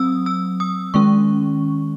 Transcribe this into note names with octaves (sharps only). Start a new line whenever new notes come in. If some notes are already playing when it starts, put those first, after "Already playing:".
Already playing: F#3 C4 D#6 E6
E6
D#6
D#3 G#3 C#4 C#6